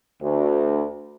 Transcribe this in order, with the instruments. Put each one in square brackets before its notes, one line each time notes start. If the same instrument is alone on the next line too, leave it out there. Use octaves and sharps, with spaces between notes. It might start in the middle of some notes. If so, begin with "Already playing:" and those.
[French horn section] D2